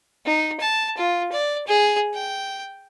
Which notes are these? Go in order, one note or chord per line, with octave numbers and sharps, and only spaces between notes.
D#4
A5
F4
D5
G#4
G5